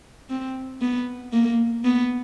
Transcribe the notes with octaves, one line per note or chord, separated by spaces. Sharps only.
C4
B3
A#3
B3